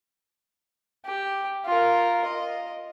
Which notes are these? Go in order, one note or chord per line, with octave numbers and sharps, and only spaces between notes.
G4
F4 A#4
D#5